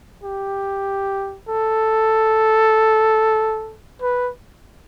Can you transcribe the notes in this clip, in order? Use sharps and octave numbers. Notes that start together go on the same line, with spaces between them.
G4
A4
B4